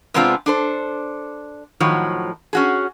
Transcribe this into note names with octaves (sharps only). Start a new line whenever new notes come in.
C3 G#3 B3 C4 D4 F4
D4 A4 C5
A2 D#3 F3 F#3
C#4 F#4 G#4